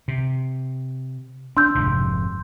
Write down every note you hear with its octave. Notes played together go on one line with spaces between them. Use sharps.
C3
D4 C6 E6 G6
F1 G#2 C3